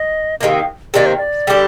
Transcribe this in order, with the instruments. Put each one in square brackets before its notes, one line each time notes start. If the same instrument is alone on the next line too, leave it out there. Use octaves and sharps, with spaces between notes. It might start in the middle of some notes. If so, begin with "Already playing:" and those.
Already playing: [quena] D#5
[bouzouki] C3 D#3 A#3 [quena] F5
[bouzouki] C3 D#3 A#3 [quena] D5
[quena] C5
D5
[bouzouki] D3 G3 D4 G4